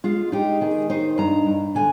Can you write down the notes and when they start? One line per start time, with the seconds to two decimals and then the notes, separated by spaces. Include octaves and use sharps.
0.04 G#3 F4
0.32 D#4 G4
0.61 D#3 G#4
0.90 D#4 C5
1.18 G2 A#5
1.46 G2
1.75 D3 G#5